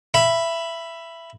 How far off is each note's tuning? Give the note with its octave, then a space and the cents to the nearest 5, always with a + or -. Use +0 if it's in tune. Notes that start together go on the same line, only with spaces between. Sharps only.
E5 +20 B5 +0